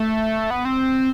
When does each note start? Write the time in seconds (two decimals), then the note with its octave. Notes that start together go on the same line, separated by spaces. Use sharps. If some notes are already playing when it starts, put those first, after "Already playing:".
Already playing: A3
0.50 B3
0.65 C4